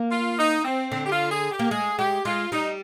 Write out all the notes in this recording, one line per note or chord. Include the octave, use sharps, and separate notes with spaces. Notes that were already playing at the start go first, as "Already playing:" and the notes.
Already playing: A#3
F4
D#4
C4
D3 C4
G4
F4
G#4
G4
A#3
G#3 G#4
G#3 G4
G#3 F4
G3 D#4